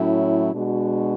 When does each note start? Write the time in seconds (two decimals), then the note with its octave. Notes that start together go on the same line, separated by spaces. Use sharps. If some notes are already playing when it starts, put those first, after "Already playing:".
Already playing: A2 F#3 C#4 E4
0.54 B2 G#3 D4 F#4